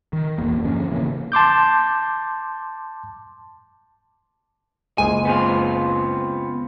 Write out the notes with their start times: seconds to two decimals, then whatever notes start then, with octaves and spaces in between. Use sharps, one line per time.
0.13 D#3
0.38 D#1 A#1 E2 A#3
0.64 G2 D3 F3 C#4
0.91 A1 C#3 E3 A#3
1.32 A5 C6 D6 G6
4.98 F#1 C#2 G#3 G#4 G#5
5.25 B3 C4 F4